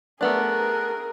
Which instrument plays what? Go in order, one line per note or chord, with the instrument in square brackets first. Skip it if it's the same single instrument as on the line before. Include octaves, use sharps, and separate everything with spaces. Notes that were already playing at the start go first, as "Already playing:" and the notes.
[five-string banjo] A3 B3 D4 [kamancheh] G#4 A#4 [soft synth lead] F#6